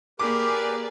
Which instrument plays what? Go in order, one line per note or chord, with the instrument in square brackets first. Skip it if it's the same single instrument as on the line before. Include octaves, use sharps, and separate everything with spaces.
[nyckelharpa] A#3 [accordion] G4 A#4 B4 [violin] G#4 D5 [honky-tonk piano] D6